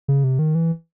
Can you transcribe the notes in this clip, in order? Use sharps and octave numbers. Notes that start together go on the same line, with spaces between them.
C#3
C3
D#3
E3